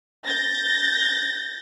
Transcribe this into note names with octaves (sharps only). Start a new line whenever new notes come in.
G6 A6 A#6